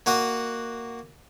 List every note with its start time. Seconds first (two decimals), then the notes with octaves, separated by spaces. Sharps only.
0.06 A#3 F#4 D#5 F#5